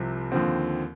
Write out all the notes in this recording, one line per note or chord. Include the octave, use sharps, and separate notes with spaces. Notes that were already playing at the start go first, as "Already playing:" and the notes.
Already playing: C2 C3 F3 C4
D#2 D3 F3 C4